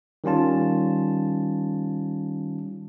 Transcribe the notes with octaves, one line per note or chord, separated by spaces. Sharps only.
D#3 G3 C#4 F4 A5